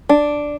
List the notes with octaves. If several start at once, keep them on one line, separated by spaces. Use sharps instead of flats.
D4